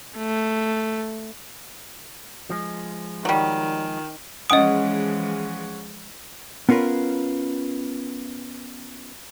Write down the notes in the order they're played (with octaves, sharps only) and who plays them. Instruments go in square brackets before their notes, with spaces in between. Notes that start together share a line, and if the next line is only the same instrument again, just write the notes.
[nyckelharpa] A3
[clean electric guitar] F3 G#3
[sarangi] D#3 [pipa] F#3 G3
[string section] E3 F3 G#3 [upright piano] C#4 F#5 D7 [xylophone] D#5 D#6
[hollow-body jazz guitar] B3 C#4 F4 A#4 B4